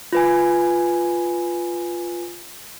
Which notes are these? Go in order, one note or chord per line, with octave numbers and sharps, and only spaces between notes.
F4 B4 G#5